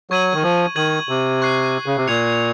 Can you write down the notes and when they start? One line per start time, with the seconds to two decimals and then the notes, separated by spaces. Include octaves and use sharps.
0.10 F#3 C#6 G#6 D#7 F#7
0.33 D#3
0.43 F3
0.76 D#3 G#6 D#7 F#7
1.09 C3
1.42 C#6 F#6 C7
1.86 C#3
1.97 C3
2.07 A#2 G#6 C#7 F7